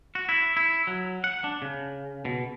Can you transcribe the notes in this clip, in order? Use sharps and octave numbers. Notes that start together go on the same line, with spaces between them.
F#4
E4
E4
F#3
F#5
D4
C#3
B2